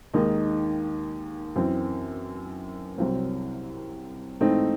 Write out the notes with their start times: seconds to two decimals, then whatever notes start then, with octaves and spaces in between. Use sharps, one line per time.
0.14 D#2 D#3 G#3 D#4
1.56 F#2 E3 C4
2.98 C2 C3 F#3 C4
4.40 G#2 E3 A3 C4 D#4